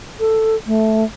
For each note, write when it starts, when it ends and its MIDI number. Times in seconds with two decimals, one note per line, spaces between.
0.19 0.56 69
0.66 1.04 57